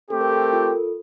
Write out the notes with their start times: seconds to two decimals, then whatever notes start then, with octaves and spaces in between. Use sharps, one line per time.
0.10 A3 C4 G4 A4
0.21 A#4
0.31 A4
0.42 A#4
0.53 F4 A4